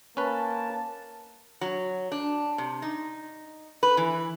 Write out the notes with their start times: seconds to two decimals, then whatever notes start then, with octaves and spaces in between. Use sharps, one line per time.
0.17 A#3 C#4 B4 A5
1.61 F#3
2.12 D4
2.58 C3
2.82 D#4
3.83 B4
3.97 E3